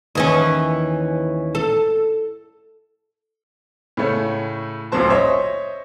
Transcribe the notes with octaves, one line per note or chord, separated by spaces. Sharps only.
D#2 E3 C#4
A4
A2 C#3 A3 C#4
A1 D2 A#2 F#3 C5 A5
C5 C#5 D#5 E5